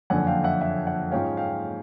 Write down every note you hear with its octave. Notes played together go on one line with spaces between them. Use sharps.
F#1 F2 D3 F#5 G#5
F5 G5
E5 F#5
E5 F#5
E5 F#5
G#2 F3 G#3 C#4 F5 G5
F5 G5